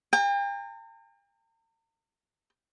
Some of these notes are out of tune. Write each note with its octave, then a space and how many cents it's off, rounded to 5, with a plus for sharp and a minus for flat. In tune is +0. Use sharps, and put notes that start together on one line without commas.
G5 +40 A#5 -40